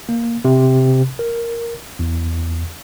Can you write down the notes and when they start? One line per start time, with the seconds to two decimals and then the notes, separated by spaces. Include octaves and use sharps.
0.09 A#3
0.45 C3
1.19 A#4
1.99 E2